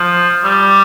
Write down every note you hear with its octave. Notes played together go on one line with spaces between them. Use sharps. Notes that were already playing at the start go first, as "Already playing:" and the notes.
Already playing: F3
G3